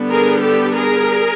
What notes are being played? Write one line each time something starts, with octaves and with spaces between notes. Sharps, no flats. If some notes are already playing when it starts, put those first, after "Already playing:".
Already playing: D3 G3 B3 D4
G#4 A#4
G4 A4
G#4 A#4